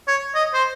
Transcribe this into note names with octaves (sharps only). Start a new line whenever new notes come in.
C#5
D#5
C5